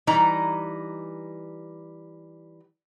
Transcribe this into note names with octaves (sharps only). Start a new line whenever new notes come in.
E3 G3 D#4 A#5